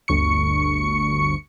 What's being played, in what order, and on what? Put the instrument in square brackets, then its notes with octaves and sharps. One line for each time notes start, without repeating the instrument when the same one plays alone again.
[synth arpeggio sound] G1 D2 C#6 C#7